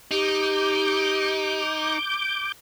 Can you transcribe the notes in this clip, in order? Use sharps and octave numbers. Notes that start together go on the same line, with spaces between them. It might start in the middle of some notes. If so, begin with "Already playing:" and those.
D#4 G4 D6 G6